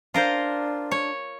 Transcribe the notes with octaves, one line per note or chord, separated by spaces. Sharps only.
D4 F4 A#4 C5
C#5